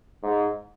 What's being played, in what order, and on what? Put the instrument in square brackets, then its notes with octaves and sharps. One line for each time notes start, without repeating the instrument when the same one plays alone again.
[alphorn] G#2